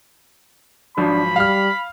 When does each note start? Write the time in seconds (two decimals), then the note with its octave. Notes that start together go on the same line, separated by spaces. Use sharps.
0.98 G#1 F3 F#3 D4 B5
1.36 G3 F5 F6